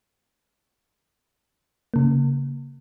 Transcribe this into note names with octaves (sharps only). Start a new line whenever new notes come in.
C#3 A#3